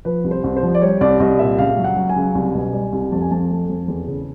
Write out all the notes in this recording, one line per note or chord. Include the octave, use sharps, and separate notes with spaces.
F3 B4
C2
C5
C2
C5
F3
D5
G3 C#5
C2 D5
C2 D#5
A#2 E5
C#2 F5
F#3
F#5
F#3
G#5
C#2
C2
B2
G3
C2
F2 A5
G#5
F2 A5
A3
F2
E2
C#3